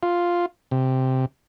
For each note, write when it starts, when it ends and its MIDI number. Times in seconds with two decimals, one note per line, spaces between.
0.03 0.46 65
0.71 1.25 48